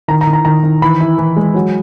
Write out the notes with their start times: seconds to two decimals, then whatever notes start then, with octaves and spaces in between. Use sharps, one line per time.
0.08 D#3 A#5
0.21 A#5
0.27 D#3
0.33 A#5
0.45 D#3 A#5
0.63 D#3
0.82 E3 B5
1.00 E4
1.18 E3
1.36 G#3
1.54 F#3